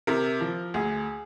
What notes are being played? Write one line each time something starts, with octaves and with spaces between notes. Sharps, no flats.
C3 A#4
F3
D2 G#4